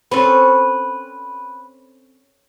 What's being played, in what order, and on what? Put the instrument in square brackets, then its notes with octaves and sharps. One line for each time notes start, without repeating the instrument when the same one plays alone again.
[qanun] C4 C#4 A4 [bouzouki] B4